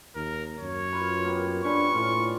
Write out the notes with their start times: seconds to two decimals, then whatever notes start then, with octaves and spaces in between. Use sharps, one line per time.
0.16 D#2 A#4
0.60 F#2 C#5
0.93 F4 B4
1.24 A#3 B3 G4
1.65 C#4 D4 B4 C#5 C#6
1.94 A2 F4 D5